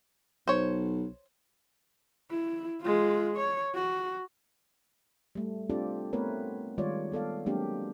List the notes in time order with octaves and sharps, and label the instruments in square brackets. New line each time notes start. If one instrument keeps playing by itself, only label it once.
[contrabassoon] B1 [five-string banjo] C5 C#5
[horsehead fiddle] E4
G#3 F4
C#5
F#4
[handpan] G3 A3
C4 D4 F4 G4 A4 D5
A3 B3 C4 A#4 B4 C#5
D#3 G3 G#3 F4 C#5 D5
B3 A4 D5 F5
F#3 G#3 A#3 C4 D4 G4